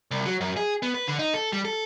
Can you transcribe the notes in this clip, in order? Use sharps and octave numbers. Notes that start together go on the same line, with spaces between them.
C2
F#3
F#2
G#4
B3
B4
D3
D#4
A4
G3
A4